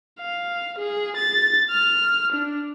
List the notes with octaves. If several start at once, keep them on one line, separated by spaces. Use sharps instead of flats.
F5
G#4
A6
F6
D4